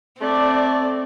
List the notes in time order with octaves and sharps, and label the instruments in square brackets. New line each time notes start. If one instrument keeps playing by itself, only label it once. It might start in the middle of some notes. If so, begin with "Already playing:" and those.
[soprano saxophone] A3 [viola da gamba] C4 [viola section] D5